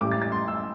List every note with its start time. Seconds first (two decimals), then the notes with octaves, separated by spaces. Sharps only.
0.01 A1 A2 G3 D6
0.11 A6
0.22 A6
0.32 C6
0.48 E6